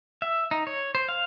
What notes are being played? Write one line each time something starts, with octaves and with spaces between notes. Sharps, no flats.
E5
D#4
C#5
C5
F5